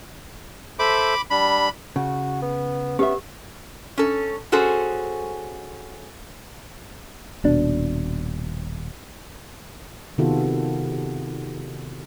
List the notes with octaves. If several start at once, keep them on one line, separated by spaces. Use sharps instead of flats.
A4 C5 E5 B5 D6
G3 D4 B5
C#3 F#4
B3
B3 C#4 G4 E5
C#4 A4
C#4 F#4 G#4 A4 C5
D#1 B2 D4
C3 D#3 B3 F4 F#4 A4